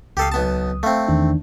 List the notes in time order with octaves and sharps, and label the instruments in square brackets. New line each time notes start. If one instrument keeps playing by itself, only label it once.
[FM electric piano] C#2 D#6 [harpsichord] G4 A4 F5
[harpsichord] B1 B3 A5
[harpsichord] A3 C4 [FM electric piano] F5
[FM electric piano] E2 D#3 D4